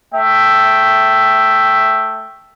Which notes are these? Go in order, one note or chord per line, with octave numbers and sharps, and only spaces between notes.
A3 E5 G5